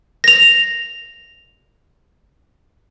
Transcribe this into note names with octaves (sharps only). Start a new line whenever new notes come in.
A#6 F7